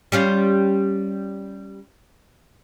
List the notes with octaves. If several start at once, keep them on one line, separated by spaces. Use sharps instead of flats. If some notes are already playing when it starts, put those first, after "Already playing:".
G3 C#4 F4